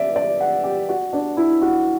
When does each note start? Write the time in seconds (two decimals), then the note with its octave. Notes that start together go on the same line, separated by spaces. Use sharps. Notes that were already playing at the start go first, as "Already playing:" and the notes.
Already playing: D5 E5
0.16 D5
0.40 F#5
0.64 G4
0.89 F#4
1.13 D4
1.37 E4
1.62 F#4